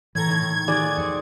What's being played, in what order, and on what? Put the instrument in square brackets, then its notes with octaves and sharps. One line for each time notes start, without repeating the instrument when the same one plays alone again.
[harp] A2 A4 A#5 [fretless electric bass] E3 [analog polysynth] G#6
[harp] A2 D#3
[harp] D#3 F#4 [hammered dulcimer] G#4 D5
[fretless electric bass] F2 D#3 [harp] C4 D#5 C#7